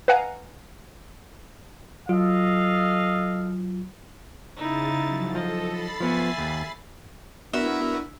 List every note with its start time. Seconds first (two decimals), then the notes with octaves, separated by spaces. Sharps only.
0.08 B4 D#5 F5 F#5 G#5 A#5
2.09 F#3 F4 A4 D#5 F5
4.57 C#3 D#4 E4 A6
5.04 F3 F#3
5.35 F3 A4 D#5
5.67 B5 A6 C7
6.00 F3 B3 E5 G#5
6.38 D#2
7.54 B3 D4 E4 F#4 A#4 E5